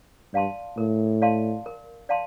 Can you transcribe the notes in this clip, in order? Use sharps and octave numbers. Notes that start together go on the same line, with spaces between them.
G2 D5 F5 A5 C6
A2 A#4
D5 F5 A5 C6
A#4
D5 F5 A5 C6